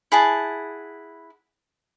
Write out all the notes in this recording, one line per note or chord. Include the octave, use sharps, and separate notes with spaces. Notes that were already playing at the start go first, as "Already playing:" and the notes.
E4 G#4 F#5 A5